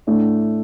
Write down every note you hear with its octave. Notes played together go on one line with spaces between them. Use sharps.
A2 A3 D4